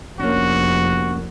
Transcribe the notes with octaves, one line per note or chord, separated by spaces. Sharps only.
F1 A#3 C#4 D4 F#4